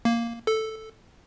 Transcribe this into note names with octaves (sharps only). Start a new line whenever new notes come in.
A#3
A4